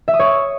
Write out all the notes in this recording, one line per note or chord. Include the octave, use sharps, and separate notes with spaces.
E5
D#6
C#5